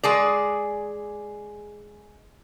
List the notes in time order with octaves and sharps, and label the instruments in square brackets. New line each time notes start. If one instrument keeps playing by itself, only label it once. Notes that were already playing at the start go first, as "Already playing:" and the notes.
[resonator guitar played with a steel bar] G#3 G#4 D5